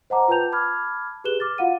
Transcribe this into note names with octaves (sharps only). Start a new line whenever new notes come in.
C5 D#5 F#5 A5 A#5 D6
F4 B4 G5 A5 G6 F7
A5 B5 D6 F6 G#6
G4 G#4 B4 F#6 E7 G7
D6 F6 A6
F4 F#4 F5 F#5 D#7